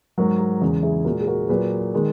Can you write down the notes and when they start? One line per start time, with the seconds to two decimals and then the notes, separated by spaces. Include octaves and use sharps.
0.18 G#2 F#3 F#4 A#4
0.40 F#4
0.62 E2 C#3 G#3
0.83 E4 G#4
1.05 A#2 G#3 F#4 A#4
1.21 G#4
1.27 F#4 A#4
1.48 A#2 F#3 G#4 B4
1.94 D#3 G#3